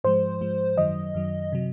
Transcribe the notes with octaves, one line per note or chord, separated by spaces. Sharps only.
G#2 F3 G#3 C5
G#2 F3 G#3
F#2 D#3 F#3 D#5
F#2 D#3 F#3
C3 F#3